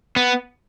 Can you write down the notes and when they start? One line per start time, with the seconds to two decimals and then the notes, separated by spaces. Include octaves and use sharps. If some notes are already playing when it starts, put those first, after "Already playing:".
0.16 B3